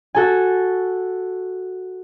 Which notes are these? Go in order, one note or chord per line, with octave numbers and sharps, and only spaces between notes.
F#4 A4 G#5